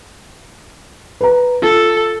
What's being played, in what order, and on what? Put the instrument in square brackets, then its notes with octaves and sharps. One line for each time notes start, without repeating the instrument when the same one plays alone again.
[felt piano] B4 A#5
[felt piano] F4 [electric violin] A4